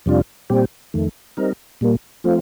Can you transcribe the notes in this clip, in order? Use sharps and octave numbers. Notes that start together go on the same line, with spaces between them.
F2 C3 G3 D4 F4
A#2 G3 C4 G4
F2 D#3 A3
G3 C4 D#4 A#4
A#2 G3 A#3
F3 A3 C4 F4